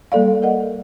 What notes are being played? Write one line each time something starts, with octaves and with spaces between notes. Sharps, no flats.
G3 A#3 A4 D5 F5
A#4 D#5 F#5